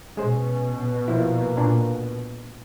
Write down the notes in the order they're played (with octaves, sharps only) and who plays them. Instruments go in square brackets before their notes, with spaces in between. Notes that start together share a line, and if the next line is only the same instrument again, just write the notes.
[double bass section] B2 [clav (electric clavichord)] G#3 G#4 C5 [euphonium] C#4
[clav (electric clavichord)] F3 E4 [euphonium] A#3
[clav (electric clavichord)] A#2 C#4 D4